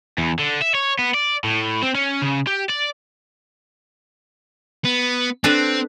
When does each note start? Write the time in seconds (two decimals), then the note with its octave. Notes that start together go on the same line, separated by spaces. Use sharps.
0.18 E2
0.39 D3
0.62 E5
0.74 C#5
0.99 B3
1.14 D5
1.44 A2
1.82 C4
1.95 C#4
2.22 C#3
2.47 G4
2.69 D5
4.85 B3
5.44 C4 D4 A4 B4